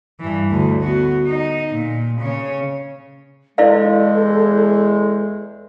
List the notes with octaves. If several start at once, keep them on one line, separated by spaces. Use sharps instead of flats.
G2 E3
D2
B3 F#4
D#4
A#2
C#3 C#5
E2 G#3 E4 A4 D5 F5